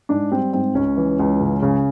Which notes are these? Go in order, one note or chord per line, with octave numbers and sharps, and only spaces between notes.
G#2 D4
G3 C4
G#2 C4
C#2 C#4
E3
C#2
C#3
C#3